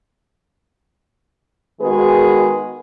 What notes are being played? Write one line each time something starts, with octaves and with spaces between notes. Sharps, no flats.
D#3 G#3 B3 F#4 G#4 B4